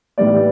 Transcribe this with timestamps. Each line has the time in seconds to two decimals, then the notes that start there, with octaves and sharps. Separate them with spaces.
0.18 A2 E3 G3 B3 D5